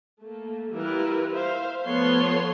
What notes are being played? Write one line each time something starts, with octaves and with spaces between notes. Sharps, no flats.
A3 A#3
E3 G3 E4 F4 A#4 B4
C5 E5 F5
F3 A3 B3 A4 C#5 C6